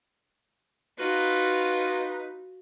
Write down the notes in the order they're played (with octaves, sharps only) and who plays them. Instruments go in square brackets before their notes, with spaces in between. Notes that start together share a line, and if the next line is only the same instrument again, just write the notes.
[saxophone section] D#4 B4 [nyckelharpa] F4 F#4